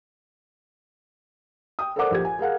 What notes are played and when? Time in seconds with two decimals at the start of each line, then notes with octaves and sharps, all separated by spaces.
1.79 G5 D#6
1.96 A4 A#4 C5 D5 F#5 D6
2.11 A#1 G4 G#6
2.25 G#5
2.39 G#4 A#4 F5 F#5